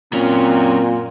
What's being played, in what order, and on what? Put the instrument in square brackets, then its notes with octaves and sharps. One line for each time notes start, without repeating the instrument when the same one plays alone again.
[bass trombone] A#2 [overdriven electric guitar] F#3 C#4 [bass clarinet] C4